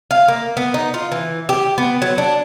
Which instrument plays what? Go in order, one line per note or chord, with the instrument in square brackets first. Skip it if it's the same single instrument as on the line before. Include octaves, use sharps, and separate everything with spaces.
[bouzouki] F5
A#3
B3
D#4
F4
E3
G4
B3
F#3
D4